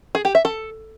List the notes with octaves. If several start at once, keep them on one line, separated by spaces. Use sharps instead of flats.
G#4
G4
E5
A4